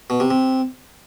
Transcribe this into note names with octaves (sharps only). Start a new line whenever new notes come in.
B2
C3
C3